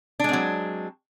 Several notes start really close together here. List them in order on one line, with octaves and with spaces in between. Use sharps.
D4 G#3 C4 F#3